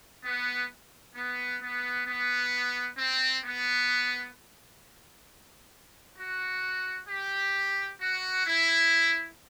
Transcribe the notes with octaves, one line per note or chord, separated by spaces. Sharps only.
B3
B3
B3
B3
C4
B3
F#4
G4
F#4
E4